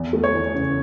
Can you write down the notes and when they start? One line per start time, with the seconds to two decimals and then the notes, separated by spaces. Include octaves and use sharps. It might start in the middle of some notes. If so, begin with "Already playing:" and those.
Already playing: E2
0.13 A3
0.24 C#5
0.34 E3
0.54 C#3